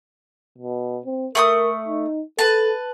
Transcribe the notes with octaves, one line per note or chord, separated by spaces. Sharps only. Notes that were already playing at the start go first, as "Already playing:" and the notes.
B2
C4
A3 A#4 B5 D#6
D#4
A4 B4 A5